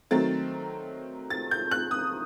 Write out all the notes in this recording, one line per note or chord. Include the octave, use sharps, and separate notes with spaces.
D#3 F#3 A3 C4 A6
A6
G6
F#6
D#6